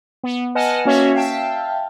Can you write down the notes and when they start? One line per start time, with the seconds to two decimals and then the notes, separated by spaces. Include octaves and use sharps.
0.24 B3
0.55 B4 D#5 F#5 G#5 A5 F6
0.85 A#3 C#4 F#4 C#5 E5
1.13 E5 F5 G5 A5